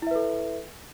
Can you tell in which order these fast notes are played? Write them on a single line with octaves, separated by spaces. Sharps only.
E4 E5 B4 A4